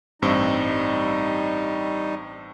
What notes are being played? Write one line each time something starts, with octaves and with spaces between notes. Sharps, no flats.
A1 G2 G3 C4 D#4